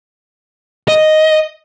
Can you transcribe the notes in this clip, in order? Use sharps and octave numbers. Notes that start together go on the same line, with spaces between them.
D#5